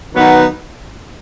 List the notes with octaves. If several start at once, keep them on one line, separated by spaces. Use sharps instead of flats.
D#3 F#3 B3 D#4